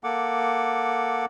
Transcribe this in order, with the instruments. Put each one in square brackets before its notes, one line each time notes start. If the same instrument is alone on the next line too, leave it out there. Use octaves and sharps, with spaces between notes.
[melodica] A#3 A4 F#5 D6